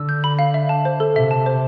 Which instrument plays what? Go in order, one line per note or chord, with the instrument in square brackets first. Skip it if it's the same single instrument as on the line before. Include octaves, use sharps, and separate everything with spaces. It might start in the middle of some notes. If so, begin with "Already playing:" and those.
Already playing: [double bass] D3 [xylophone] E6
[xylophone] G6
B5
F5
E5
A5
C5
A4
[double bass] C3 [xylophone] E5
[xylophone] A5
C5